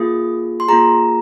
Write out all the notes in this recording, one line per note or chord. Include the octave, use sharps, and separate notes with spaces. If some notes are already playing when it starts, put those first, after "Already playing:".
Already playing: A#3 F4 G#4 D#6
C6
A#3 F4 G#4 A#5